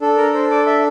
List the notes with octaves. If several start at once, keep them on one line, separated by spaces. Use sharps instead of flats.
D4 A4
A#4
C5
D5
E5